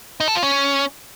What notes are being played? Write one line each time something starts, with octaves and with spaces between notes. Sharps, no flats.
D#4
A4
F4
C#4